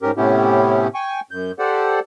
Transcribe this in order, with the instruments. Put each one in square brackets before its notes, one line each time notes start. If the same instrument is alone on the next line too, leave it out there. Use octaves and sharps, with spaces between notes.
[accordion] G#2 C#4 G4 A#4
A2 C3 B3 C#4 E4 G4
G5 G#5 C#6
F#2 G6
G4 A4 C5 D5 F#5